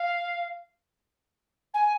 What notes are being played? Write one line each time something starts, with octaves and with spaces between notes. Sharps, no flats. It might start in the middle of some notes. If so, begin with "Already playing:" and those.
Already playing: F5
G#5